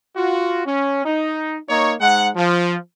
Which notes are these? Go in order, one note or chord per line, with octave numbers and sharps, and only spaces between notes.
F4 F#4
C#4
D#4
A#3 D#4 C#5
G#2 F#5
F3